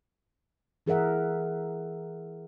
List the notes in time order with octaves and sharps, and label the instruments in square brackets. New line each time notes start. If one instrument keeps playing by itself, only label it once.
[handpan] E3 G#4 A#4 E5 F#5